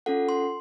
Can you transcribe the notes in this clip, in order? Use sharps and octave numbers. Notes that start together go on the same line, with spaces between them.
C#4 F4 A4 F#5
C6